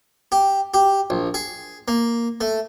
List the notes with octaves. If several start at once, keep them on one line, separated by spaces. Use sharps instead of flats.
G4
G4
A#1
G#4
A#3
A3